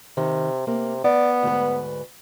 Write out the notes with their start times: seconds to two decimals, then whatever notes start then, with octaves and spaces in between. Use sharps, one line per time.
0.17 C3 D#3
0.67 C3 A#3
1.04 B3 D5
1.43 D2 G#2 B4